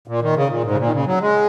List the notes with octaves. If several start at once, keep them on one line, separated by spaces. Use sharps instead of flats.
A#2
D#3
C#3
A#2
G#2
C#3
A#2
D#3
C#3
F#3
G#3